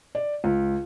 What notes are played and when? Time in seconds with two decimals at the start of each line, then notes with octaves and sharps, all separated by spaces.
0.15 D5
0.44 C#2